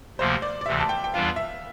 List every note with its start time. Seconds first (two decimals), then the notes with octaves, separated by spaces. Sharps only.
0.19 D2 C3 F3 A#3 C5
0.42 D5
0.61 D5
0.66 D2 C3 E3 E5
0.80 A5
0.89 G5
1.04 G5
1.13 E2 E3 G3 D4 F4 F5
1.36 E5